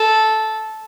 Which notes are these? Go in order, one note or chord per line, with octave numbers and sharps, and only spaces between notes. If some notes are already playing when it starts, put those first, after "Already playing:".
Already playing: A4